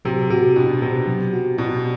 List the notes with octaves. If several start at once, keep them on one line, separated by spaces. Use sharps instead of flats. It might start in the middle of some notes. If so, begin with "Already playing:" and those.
C3 F#3
C3 F#4
B2 D4
C3 B3
F#3
F#4
B2 D4